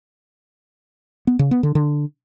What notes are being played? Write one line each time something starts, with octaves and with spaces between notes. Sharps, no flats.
B3
C#3
B3
D3
D3